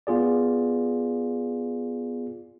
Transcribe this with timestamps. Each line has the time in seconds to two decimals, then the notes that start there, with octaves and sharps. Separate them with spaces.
0.07 B3 F4 G#4 D5